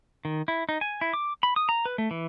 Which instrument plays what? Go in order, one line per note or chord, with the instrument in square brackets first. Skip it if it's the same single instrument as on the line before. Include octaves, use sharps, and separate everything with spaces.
[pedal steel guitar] D#3
E4
D#4
G#5
E4
D6
B5
D#6
A#5
B4
A3
E3